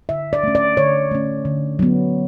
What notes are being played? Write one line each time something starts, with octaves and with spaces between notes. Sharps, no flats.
D3 E5
D5
A3 C#4
D5
D3 C#5
A3 C#4
D3
F#3 B3